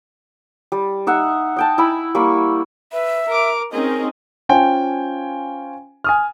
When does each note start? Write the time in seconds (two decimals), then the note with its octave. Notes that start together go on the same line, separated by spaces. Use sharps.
0.72 G3
1.07 D#4 E5 F#5
1.56 D#5 G5 A5
1.78 E4 G#5 B5 E6
2.15 G3 A#3 B5 C#6
2.92 B4 E5
3.27 A#4 D6
3.72 C4 C#4 D#4 G#4 A#4 D#5
4.49 C#4 F4 C5 G5 G#5
6.04 G#5 D#6 F6